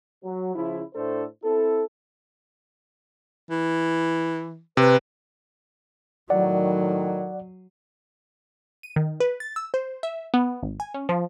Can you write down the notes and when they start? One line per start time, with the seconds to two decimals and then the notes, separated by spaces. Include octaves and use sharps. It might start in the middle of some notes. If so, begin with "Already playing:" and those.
0.24 F#3
0.55 C#3 F3 E4
0.95 A2 A3 D4 A4 C5
1.43 C4 E4 A4
3.51 E3
4.77 C3 B4
6.30 A2 D#3 F#3 D5 F#5
8.83 D#7
8.96 D#3
9.20 B4
9.40 A6
9.56 E6
9.74 C5
10.03 E5
10.34 B3
10.62 G#1
10.80 G#5
10.94 C#4
11.09 F3